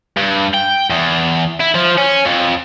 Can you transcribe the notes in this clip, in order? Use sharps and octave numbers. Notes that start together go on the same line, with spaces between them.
G2
G5
E2
E4
F3
C#4
F2